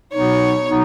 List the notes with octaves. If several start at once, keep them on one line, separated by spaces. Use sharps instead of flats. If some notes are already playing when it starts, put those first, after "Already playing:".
B2 F#3 B3 D#4 C#5
B2 F#3 B3 D#4